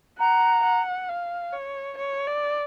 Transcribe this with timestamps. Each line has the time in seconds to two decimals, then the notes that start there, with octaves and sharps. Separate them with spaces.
0.19 F#5 A#5
0.63 F#5
1.09 F5
1.53 C#5
1.97 C#5
2.27 D5